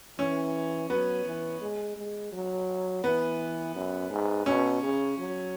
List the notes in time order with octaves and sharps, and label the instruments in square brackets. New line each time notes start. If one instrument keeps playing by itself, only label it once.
[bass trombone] E3 [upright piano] C#4
[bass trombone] F#3 [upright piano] B3
[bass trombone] E3
G#3
G#3
F#3
[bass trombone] E3 [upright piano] B3
[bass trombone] F#2
G#2
[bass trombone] B2 [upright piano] C#4
[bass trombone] C#3
F#3